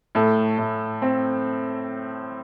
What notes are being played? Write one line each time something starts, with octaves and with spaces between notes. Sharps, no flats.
A2 A4
A2
C4